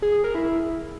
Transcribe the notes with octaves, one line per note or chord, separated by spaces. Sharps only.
G#4
G#4
A#4
E4